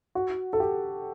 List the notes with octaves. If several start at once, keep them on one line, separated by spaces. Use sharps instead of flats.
F#4
A4
G4